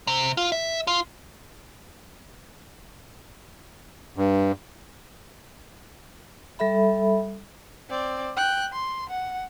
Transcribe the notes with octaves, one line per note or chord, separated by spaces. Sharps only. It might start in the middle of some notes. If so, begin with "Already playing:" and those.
C3
F4
E5
F4
G2
G3 A4 E5 B5
C4 D5
G5 F#6
C6
F#5